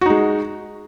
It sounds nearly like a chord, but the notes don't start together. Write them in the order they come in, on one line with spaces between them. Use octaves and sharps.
F#4 D#4 G#3